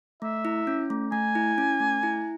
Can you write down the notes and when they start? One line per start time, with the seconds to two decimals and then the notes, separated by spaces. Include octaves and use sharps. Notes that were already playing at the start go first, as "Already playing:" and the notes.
0.22 A3 E5
0.45 E4
0.67 C#4
0.90 A3
1.12 A3 G#5
1.35 E4
1.58 C#4
1.80 A3
2.03 E4